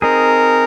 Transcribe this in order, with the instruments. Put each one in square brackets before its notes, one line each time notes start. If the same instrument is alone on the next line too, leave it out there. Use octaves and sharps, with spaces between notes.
[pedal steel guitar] C4 D#4 G#4 [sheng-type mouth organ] A#4